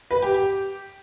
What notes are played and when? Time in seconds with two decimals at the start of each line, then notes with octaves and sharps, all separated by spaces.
0.11 B4
0.22 G4
0.34 G4